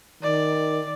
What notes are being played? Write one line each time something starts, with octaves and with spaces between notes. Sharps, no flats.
D#3 D5